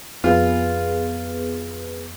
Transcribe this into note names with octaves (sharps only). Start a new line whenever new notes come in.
F2 B3 F4 G#4 B4